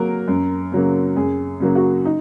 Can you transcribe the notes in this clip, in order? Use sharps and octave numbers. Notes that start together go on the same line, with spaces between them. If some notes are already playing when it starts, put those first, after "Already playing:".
Already playing: F#3 A#3 A#4
F#2
C#3 F#3 A#3
F#2 G#4
C#3 F#3 A#3
F#4
D#4